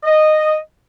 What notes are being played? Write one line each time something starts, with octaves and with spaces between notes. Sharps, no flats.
D#5